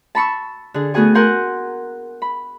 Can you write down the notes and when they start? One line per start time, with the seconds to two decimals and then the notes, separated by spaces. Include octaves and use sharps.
0.15 A5 B5 C#6 E6
0.74 D3 G#4
0.94 A3 B3 F#4 G#4 G#5 C#6
1.15 A#4 F#5 G#5 C6 G6
2.22 B5